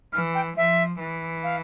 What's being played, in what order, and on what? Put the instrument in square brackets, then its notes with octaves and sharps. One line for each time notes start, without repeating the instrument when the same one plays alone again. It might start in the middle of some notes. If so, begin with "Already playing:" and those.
[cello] E3 [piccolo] F6
[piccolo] G5
[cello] F3 [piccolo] E5
[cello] E3
[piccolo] F5